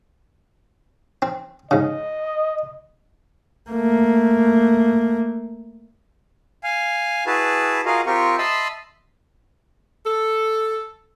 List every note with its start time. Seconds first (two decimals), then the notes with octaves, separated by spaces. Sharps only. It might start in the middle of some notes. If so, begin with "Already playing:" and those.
1.22 C4
1.71 G#2 C#3 D#5
3.71 A3 A#3
6.64 F5 G#5
7.27 E4 F#4 G#4 B4 A5
7.86 F4 F#4 G#4 A#4 D#5 F5
8.06 C4 F4 G4 A#4 C#6
8.38 D#5 E5 A5 B5 C6
10.05 A4